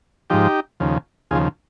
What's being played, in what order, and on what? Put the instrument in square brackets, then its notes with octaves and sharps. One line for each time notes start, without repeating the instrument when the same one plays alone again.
[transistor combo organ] G#2 F3 D#4 G4
D#2 C#3 F3
D#2 C#3 F3 F4 G#4